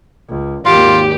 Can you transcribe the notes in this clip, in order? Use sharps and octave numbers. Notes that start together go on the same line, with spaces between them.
C#2
G#1 D#2 F4 G4